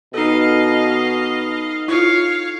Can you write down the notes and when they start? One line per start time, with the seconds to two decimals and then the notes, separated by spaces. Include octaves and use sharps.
0.14 B2 D#4 A4 D#5 F5
1.88 E4 F4 C#5 F5